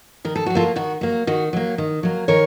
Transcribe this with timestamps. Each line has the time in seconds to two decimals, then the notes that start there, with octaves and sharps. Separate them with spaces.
0.25 D#3 A#4
0.36 A4
0.46 F#3 F#4
0.55 A#3 F4 A4
0.76 D#3 F#4
1.01 F#3 A#3
1.27 D#3 F#4
1.53 F#3 A#3
1.78 D#3
2.03 F#3 A#3
2.28 D#3 A#4 C#5